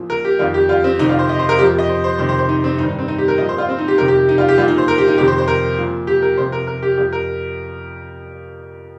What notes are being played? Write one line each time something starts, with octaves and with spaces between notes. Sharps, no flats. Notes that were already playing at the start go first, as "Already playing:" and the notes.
Already playing: A#2 F3
A#4
G4
F2 D#3 F4
G4
F4
C4
F2 C3 D#3 D#4
F4
C5
D#5
C5
A#4
F2 F3 G4
D#5
C5
C5
F2 C3 D#3 C5
C5
C5
D#4
C4
G2 D#3 D#4
D#4
C4
D#4
G4
A#4
A#2 F3 D#5
C5
F4
C4
D#4
G4
F2 C3 D#3 A#4
G4
D#4
F4
G4
A#2 F3 F4
D#4
C5
A#4
G4
D#4
F2 C3 D#3 G4
C5
C5
A#4
A#2 F3
G4
A#4
F2 C3 F3 C5
A#4
A#4
G4
F2 F3 G4
A#4